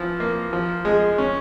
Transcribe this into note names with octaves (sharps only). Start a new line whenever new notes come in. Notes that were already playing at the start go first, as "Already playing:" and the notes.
Already playing: E3 F3
A#3
F3
G#3
C#4